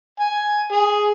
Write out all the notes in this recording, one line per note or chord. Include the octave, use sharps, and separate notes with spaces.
G#5
G#4